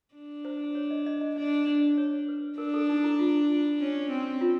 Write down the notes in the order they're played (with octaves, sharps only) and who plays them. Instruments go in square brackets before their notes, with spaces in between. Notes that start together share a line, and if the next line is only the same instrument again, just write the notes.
[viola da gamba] D4
[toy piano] C5
C#5
D#5
D#5
D#5
[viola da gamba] D4 [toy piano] D5
[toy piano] D5
C#5
B4
[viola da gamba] D4 [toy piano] A#4
[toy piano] A4
D#4
E4
F4
[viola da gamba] C#4
C4
[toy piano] F4